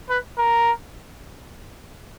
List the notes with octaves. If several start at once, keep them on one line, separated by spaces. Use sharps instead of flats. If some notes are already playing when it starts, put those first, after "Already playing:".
B4
A#4